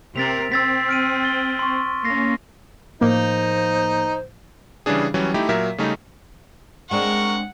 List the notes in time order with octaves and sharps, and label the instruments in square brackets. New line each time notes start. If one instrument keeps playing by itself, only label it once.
[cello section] C3 C4 A#4 [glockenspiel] A6 B6 F7
[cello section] C4 [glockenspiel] E6 A6 B6
[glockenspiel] F6 D7 D#7
A6 G7
C6 C#6
[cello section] A#3 C#4 [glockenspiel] A#6 C7
[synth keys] A2 F3 [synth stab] A#3 [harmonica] D#4 [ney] C5
[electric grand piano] C#3 E3 G3 C#4 D4 G#4
E3 F#3 G3 C#4
A3 D#4 E4 G4
A#2 F#3 A#4 E5 B6
C#3 G3 A3 C#4 D#4
[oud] G#3 C4 D4 [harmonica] A#4 C#6 [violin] F#5